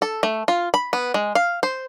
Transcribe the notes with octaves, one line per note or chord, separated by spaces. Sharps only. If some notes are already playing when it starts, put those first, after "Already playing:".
A4
A3
F4
B5
B3
G#3
F5
C5